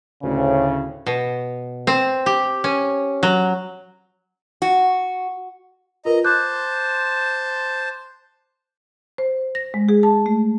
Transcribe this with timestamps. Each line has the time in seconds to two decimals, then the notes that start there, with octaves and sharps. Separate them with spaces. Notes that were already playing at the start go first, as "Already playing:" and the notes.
0.23 D2 A2 C#3
1.06 B2
1.87 C4
2.26 G4
2.64 C#4
3.23 F#3
4.62 F#4
6.05 F4 A#4 B4 D#5 A#5
6.24 C5 A5 D6 F#6 G6
9.18 C5
9.55 A#6
9.74 G#3
9.89 G#4
10.03 A5
10.26 A3